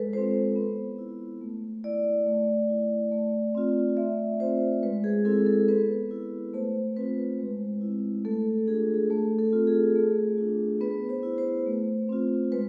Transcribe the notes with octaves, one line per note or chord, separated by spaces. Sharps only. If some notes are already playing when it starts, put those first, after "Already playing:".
Already playing: G#3 A4 B4
C4 F4 C5
B3
E4
A3
E4 D5
A3
E4
A3
C4 F4
A3 E5
C4 F4 C5
G#3 B4
G#4
C4 E4 A4
A4
B3 B4
E4
A3 C5
C4 F4 B4
G#3
C4 E4
A3 A4
D4 F4 G#4
G#4
A3 A4
A4
C4 F4
G#4
A3
D4 F4
B3 B4
C5
E4
C5
A3
C4 F4
G#3 B4